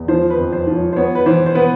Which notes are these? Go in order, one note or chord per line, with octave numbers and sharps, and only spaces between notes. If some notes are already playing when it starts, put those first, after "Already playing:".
Already playing: E2
F3 C5
B4
F2
C5
F3
C#5
C5
B3 C#5
B4
E3 C5
C5
B3 B4